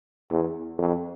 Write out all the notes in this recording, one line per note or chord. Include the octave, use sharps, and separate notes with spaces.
E2
F2